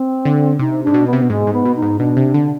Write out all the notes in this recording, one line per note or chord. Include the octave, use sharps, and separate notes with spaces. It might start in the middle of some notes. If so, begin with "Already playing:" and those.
Already playing: C4
D3
C3 D#4
G#2 D4
B2
B3
C3
B2
G#2 G#3
G#2
B3
B2
D#4
G#2
B2 D4
C3
D3